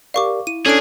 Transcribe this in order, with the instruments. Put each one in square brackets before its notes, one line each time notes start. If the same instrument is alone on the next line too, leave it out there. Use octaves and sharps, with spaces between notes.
[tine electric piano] G4 A#4 D5 [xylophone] F5 C#6 D6
[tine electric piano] E4 [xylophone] D#7
[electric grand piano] C#4 D4 [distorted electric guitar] G#4 [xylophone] A4 D7